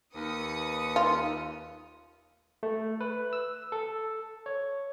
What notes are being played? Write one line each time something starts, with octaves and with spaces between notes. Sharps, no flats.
D#2 B4 D#6 C#7
F4
A3
B4
E6
A4
C#5